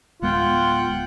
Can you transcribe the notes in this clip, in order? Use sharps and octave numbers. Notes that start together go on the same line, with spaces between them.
D1 G#3 B3 F4 F#5 G5